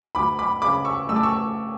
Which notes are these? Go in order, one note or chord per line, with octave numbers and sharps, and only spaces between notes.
D2 B5 D6
B5 D6
C#3 B5 D6
C#6 E6
A3 E6
D6
C#6 E6